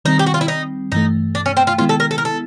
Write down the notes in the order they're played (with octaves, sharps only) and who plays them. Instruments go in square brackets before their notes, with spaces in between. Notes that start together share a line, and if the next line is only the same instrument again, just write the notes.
[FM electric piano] D#3 G3 C4 [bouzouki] D#4
[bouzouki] G4
F#4
F4
E4
D#4
[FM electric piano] G2 E3 A3 [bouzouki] D#4
[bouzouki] D4
C#4
C4
F4
[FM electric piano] D#3 G#3 B3 E4 [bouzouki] F4
[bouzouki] A4
A#4
A4
A#4
A4